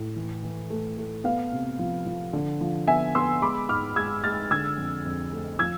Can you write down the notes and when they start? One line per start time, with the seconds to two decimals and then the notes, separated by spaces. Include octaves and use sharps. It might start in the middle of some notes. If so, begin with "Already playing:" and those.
Already playing: A2
0.16 E3
0.43 E3
0.70 A3
0.97 A3
1.24 B3 F5
1.52 C3
1.79 F3
2.06 F3
2.33 D3
2.61 F3
2.87 B3 E5 G#5
3.15 B3 C6 E6
3.42 G#3 B5 D6
3.69 G#2 D6 F6
3.96 G#3 E6 G#6
4.24 G#3 F6 A6
4.51 D3 E6 G#6
4.78 F2
5.05 F2
5.33 A3
5.59 F3 E6 G#6